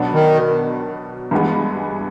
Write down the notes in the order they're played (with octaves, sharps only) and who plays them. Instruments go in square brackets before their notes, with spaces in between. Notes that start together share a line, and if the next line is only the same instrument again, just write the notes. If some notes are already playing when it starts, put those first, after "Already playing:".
Already playing: [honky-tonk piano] B2 F#3 B3 D4
[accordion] D#3
[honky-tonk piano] G2 E3 G#3 B3